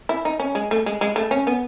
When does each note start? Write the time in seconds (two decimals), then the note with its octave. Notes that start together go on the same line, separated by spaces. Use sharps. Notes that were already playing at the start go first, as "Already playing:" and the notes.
0.09 E4
0.25 D#4
0.40 C#4
0.55 G#3
0.71 A3
0.86 G#3
1.01 G#3
1.16 A3
1.31 C#4
1.47 B3